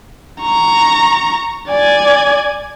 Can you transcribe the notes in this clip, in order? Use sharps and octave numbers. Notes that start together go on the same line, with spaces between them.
A#5 C#6
D5 G#5